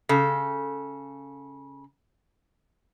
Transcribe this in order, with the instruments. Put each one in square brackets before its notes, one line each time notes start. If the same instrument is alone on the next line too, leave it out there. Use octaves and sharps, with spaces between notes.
[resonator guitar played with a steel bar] C#3 A4